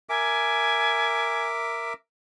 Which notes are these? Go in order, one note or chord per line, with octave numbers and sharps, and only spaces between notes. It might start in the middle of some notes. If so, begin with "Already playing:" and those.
A#4 E5 G#5 D6